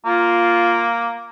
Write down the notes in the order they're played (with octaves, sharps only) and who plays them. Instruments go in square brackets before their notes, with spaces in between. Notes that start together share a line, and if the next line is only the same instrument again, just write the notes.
[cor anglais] A#3 [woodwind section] F4